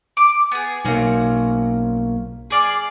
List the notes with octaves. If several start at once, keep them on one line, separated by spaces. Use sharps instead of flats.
D6
B3 G#4
B1 A#3 C4 C#4 F#4
G#4 D5 F5